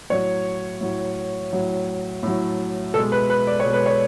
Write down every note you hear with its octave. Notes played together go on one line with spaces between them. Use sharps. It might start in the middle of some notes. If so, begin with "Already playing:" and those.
A2 F#3 C#5
A2 F#3
A2 F#3
A2 F#3
B2 G#3 A4
B4
B4
D5
C#5
B2 G#3
B4
C#5